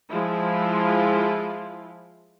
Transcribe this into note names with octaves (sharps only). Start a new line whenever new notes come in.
F3 G#3 E4 F4